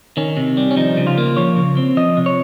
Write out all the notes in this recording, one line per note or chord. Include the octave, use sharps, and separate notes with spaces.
D#3 C#4
C3
G3
C#4
F3 D#4
C#3
F4
A#3
F3 C#5
C#3
C4
F3 D#5
C3
C#5